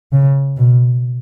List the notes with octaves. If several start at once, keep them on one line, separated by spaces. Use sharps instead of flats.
C#3
B2